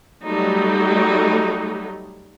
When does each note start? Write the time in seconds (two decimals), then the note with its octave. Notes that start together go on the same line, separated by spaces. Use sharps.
0.23 F#3 G3 A3 D#4